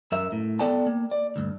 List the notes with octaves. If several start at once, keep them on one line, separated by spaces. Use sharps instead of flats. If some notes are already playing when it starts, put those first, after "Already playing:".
F#2 A#4 E5
A2
B3 A4 D5 G5 A5
A#3
D5
D2 G2